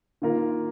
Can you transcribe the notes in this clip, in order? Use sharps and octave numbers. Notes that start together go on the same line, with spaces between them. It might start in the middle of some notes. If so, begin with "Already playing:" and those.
D#3 A#3 F4 A#4